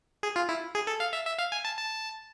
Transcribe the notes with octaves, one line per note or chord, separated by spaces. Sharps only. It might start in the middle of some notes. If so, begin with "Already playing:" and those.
G#4
F4
E4
G#4
A4
F5
E5
E5
F5
G#5
A5
A5